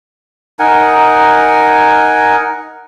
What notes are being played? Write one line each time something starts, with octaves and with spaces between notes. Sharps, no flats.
D#4 A#4 F#5 G#5